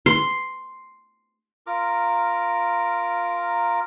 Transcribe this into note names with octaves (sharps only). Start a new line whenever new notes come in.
C6
F4 A#4 A#5 D6